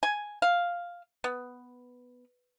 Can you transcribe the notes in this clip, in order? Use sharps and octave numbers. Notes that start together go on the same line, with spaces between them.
G#5
F5
B3